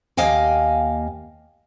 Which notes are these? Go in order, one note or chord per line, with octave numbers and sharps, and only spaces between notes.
D#2 A#3 D#5 F5 G5 G#5